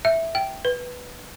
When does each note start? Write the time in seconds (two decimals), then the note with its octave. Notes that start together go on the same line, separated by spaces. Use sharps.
0.05 E5
0.35 G5
0.65 B4